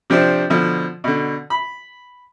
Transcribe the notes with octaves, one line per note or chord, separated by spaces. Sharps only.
C3 F3 C4 D4 C5
B2 D3 F3
B2 D3
B5